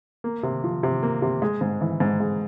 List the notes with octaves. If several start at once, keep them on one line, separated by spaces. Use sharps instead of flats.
A#3
C3
F3
C3
A#3
C3
G#3
G#2
E3
G#2
G#3